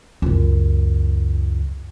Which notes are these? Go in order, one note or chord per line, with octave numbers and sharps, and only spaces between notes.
C#2 F#2